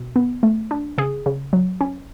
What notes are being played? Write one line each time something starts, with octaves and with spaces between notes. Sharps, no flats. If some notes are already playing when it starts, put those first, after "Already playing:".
Already playing: B2
B3
A3
D4
C#3 G#4
C#3
F#3
C#4